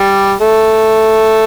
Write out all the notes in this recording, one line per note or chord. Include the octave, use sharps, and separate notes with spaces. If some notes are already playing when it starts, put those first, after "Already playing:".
Already playing: G3
A3